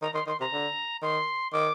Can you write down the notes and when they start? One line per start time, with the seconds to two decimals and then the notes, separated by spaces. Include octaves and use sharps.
0.02 D#3 A#5
0.14 D#3 C6
0.27 D#3 C6
0.40 C3 A#5
0.52 D3
1.02 D#3 C6
1.53 D#3 D6